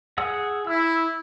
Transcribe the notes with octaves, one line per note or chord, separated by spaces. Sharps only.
G#4 F#5 E6
E4 E6